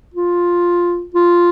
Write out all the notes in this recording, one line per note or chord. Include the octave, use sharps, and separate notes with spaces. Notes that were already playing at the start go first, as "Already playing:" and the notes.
F4
F4